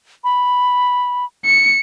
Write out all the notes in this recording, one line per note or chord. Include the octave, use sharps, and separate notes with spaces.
B5
C#7